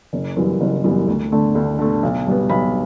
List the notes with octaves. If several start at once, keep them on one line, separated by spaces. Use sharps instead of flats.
F#1
F#2 E3 G3 B3
F#1
F#2 E3 G3 B3
D2
D3 A3
D2
D3 A3
B1
B2 G3 B3
B1 B5